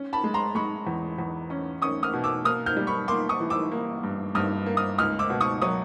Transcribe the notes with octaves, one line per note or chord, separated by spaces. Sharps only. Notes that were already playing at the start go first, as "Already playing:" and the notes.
Already playing: C#4
A5 B5
G#3
A#5 C6
G#3 B5 C#6
E2
E2
C#4
C#4 C#6 D#6
D#6 F6
B2
D6 E6
A#3 D#6 F6
F6 G6
G3
B5 C#6
A#3 C6 D6
C#6 D#6
E3
D6 E6
A#3
G2
G2 D#6 F6
A#3
D#6 F6
C#2 D#6 F6
D6 E6
B2
C#6 D#6
F#3 C#6 D#6